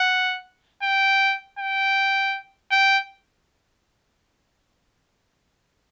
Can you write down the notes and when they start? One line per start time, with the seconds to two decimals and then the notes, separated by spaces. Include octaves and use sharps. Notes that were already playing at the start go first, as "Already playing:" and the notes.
Already playing: F#5
0.83 G5
1.59 G5
2.71 G5